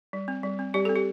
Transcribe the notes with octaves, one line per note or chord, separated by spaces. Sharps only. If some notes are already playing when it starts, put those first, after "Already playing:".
G3
C4
G3
C4
G3 G4
C4 A4
G4